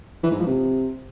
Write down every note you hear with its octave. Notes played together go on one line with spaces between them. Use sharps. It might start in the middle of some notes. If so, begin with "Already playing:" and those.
E3
G#2
F3
C3